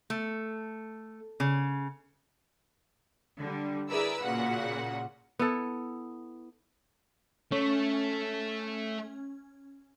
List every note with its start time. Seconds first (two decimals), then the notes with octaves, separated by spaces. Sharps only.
0.10 A3
1.40 C#3
3.39 D3 G3
3.89 E4 G#4 A#4 B4 D5 E6
4.23 A#2 C#3 F#4 F#5
5.39 B3 E4 A4
7.52 A3 C#4